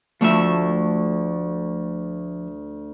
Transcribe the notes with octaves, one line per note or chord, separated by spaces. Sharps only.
D2 F3 A3 E5